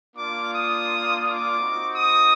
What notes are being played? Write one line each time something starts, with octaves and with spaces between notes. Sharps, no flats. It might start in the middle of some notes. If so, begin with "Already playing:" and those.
A#3 D4 F4 D6
D#6
D6
C4 D#4 F#4
D#6